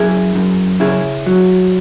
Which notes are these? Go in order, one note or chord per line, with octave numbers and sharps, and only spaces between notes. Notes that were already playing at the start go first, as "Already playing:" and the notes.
Already playing: F#2 E4 G#4
F#2
C#3 E4 G#4
F#3